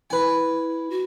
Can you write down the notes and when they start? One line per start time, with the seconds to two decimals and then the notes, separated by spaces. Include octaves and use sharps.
0.10 E4 B4 G#5
0.90 F#4